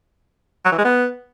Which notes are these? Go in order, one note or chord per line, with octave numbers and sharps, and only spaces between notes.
F#3
E3
G#3
B3